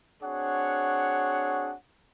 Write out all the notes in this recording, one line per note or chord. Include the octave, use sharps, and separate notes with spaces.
C4 D4 F#4 G#4 C#5 F#5